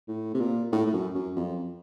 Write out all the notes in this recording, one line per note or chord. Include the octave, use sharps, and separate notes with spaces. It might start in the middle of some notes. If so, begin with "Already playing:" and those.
A2
C3
A#2
A2
A2
F#2
F#2
F2